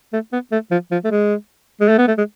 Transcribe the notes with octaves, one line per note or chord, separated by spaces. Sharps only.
A3
B3
A3
F3
F3
A3
G#3
G#3
A3
B3
A3
G#3